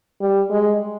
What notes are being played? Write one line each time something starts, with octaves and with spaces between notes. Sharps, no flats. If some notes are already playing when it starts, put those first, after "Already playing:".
G3
G#3